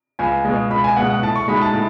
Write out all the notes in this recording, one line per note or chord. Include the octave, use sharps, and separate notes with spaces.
C#2 G#5
B2 G#3
C#2 B5
G#5
B2 G#3 F#5
F#5
A2 A5
C#6
G#3 D#4 F#4 B5
A5
A2